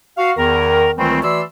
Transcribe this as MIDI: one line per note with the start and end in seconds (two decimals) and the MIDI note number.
0.17 0.30 66
0.17 0.30 77
0.37 0.91 40
0.37 0.91 51
0.37 0.91 70
0.98 1.19 37
0.98 1.19 51
0.98 1.19 52
0.98 1.19 55
0.98 1.19 57
0.98 1.19 60
1.23 1.40 52
1.23 1.40 57
1.23 1.40 66
1.23 1.40 74
1.23 1.40 84
1.23 1.40 88